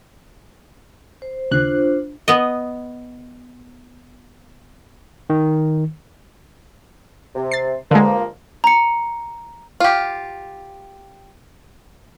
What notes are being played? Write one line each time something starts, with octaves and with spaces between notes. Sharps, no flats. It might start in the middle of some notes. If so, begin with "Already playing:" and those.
C5
D#2 C#3 D4 F4 C5 F#6
B3 D#5
D#3
C3
A6 C7
G2 D3 F3 G#3 A#3
A#5 C#7
F4 G4